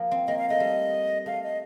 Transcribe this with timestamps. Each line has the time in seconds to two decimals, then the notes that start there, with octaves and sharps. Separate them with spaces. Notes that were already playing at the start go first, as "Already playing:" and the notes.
Already playing: F3 A#3
0.11 C4
0.27 A#3 D#5
0.38 F5
0.49 A3 D#5
0.60 G3
1.26 A3 F5
1.43 D#5